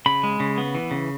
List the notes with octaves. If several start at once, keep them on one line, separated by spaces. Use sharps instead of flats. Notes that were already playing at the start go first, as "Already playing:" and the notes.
C#3 B5
G#3
C#3
B3
E3
C#3